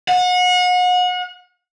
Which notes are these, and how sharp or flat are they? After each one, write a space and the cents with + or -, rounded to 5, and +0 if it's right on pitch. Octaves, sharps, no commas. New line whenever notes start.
F#5 -35